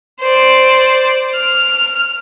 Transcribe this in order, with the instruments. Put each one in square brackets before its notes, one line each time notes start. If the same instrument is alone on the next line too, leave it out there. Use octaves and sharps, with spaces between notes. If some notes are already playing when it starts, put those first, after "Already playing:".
[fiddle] C5 D5
F6